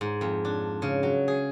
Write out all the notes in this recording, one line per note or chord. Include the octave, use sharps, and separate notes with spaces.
G#2
F2
D4
C#3
F#3
G#4